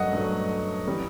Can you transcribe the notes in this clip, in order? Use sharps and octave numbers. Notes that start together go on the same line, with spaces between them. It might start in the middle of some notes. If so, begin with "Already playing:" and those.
Already playing: G2 F#3 A3 D#5 F#5
G2 F#3 A3
E3 G3